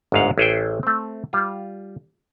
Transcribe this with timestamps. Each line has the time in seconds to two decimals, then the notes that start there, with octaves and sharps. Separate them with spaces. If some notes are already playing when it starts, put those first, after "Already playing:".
0.12 G1 D2 G#2 F5 F#5
0.38 A1 E4 G#4 A4 C5 G5
0.83 A3 C4
1.33 G3 F4